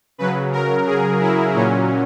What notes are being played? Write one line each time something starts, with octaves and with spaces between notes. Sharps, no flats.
C#3 F#3 B4
A#4
G#4
E4
A#2 F#3 C#4